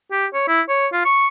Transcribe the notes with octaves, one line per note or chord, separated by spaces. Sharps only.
G4
C#5
E4
C#5
F4
C#6